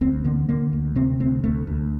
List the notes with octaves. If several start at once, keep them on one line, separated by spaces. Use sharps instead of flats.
D2 C4
D3 A#3
D3 A#3
D2
C3 C4
D2 C4
D2 A3
D2